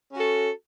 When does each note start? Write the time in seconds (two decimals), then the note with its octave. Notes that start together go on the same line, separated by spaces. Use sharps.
0.11 C#4
0.15 F#4
0.19 A4